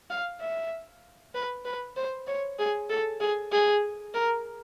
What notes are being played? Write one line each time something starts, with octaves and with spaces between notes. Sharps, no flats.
F5
E5
B4
B4
C5
C#5
G#4
A4
G#4
G#4
A#4